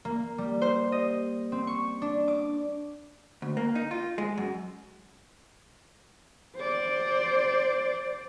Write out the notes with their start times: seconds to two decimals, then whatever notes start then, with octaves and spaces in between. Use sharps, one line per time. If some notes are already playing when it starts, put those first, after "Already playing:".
0.05 A#3
0.38 G3
0.62 C5
0.92 D#5
1.52 C4
1.67 C#6
2.02 D4
2.28 D6
3.42 D2
3.57 A#3
3.75 D#4
3.91 F4
4.18 G#3
4.38 F#2
6.56 C5 D5